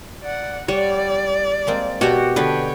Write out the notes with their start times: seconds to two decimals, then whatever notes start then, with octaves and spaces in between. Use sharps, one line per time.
0.23 D5 F#5
0.68 G3 C#5 D5 F#5
1.67 G#3 A#3 C4
2.01 B2 F#4 G4 F#5 G#5
2.36 D3 B3 B4 C#5 G5